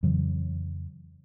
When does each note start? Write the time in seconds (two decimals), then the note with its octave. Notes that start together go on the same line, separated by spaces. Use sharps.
0.03 F2 C#3 E3 F#3